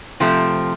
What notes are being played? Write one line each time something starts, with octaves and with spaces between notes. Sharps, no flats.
C3 F3 A3 C4